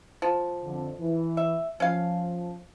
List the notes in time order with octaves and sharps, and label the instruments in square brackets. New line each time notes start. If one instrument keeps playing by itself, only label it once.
[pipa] F3
[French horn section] F2 D3
E3
[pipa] E5
[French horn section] F3 [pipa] C#4 F5